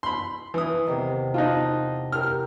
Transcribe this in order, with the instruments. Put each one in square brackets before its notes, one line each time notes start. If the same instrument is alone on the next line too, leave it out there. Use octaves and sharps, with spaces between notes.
[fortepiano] B5 C6
E3 D#6
[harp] E2 C3 D#3
[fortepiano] D#4 F4 [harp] A5 D6 F#6
[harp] G4 A#4 [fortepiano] F6